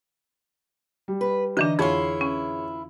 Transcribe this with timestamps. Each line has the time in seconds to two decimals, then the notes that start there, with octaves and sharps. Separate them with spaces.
1.08 G3
1.21 B4
1.57 D3 E3 D4 D#4 D#5
1.79 F2 E4 F4 G#4 C#5
2.21 C#4